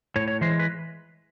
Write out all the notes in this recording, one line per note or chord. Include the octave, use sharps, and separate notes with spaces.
A2 C#5
C#5
E3 G#3 C5
B4